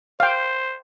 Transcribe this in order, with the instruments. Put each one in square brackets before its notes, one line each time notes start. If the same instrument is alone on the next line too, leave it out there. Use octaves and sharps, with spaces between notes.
[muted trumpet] C5 [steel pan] F5 G5